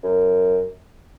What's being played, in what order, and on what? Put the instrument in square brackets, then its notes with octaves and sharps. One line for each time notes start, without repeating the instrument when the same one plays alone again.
[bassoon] F#2